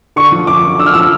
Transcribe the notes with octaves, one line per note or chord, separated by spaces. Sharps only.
D3 C#6
F3
F#2 D6
F#2
D3 E6
F6
F3 E6